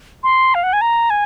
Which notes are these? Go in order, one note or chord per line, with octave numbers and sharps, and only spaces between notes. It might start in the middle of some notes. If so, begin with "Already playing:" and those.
C6
F5
F#5
G#5
A#5
G#5